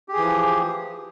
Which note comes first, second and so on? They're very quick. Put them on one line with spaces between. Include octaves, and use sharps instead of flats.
G4 G#4 E3 F3